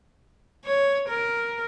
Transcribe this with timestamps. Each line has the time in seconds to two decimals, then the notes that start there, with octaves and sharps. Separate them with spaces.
0.65 C#5
1.09 A#4